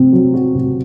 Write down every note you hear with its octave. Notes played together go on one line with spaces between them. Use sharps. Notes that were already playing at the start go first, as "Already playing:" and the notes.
Already playing: C3 C4
F#3
F#4
C3